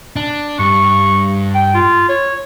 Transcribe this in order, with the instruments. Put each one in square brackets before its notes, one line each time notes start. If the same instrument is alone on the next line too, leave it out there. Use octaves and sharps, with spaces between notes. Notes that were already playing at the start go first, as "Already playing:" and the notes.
[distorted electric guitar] D4
[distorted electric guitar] G2 [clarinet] C#6
[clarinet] G5
F4
C#5